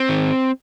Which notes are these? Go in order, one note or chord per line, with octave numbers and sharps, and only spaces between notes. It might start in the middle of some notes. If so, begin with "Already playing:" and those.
Already playing: C4
D#3